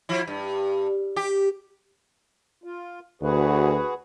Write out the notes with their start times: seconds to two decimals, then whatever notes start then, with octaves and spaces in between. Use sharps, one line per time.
0.09 F3 E4
0.28 G2
1.16 G4
2.64 F4
3.22 D2 F#4 G#4 B4